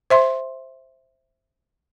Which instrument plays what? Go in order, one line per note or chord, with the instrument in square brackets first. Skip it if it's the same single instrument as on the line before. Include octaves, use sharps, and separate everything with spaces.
[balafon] C5 E5 C6